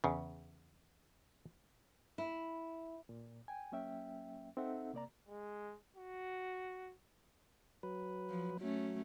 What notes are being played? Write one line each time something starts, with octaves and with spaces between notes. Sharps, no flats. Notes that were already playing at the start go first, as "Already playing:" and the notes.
E2 C#3
E4
A#2
G5 G#5
F#3 A#3 C#4 E5 G5
C4 D#4 A4 E5 F#5
C3 A#3 D5 A#5
G#3
F#4
F#3 B4
F3
F#3 A3 C#4